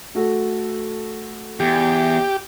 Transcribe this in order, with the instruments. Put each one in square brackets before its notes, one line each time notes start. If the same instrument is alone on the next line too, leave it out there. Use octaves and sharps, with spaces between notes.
[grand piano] A3 F#4 A4
[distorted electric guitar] E2 [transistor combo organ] G4